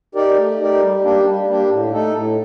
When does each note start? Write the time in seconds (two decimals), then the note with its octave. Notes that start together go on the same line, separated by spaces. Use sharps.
0.15 D#4 G4 A#4 D5
0.37 A3
0.59 D#4 G4 A#4 D5
0.81 G3
1.03 A#3 D4 G4
1.26 G3
1.47 A#3 D4 G4
1.70 A2
1.92 A3 D#4 A4
2.14 A2